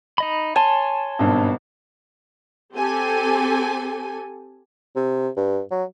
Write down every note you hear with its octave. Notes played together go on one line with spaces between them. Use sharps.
D#4 D#5 B5
C#5 G#5 A5 C6
G#1 G2 B2
C4 G4 A4 G#5
C3
G2
F#3